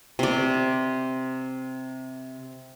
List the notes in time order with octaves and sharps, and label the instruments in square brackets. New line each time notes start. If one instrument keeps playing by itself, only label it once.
[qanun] C3 D5